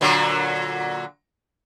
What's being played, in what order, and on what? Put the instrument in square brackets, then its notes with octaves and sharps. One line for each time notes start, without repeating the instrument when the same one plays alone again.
[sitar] A#2 D3 F#3